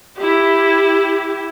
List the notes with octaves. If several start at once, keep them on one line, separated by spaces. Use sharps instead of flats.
E4 G4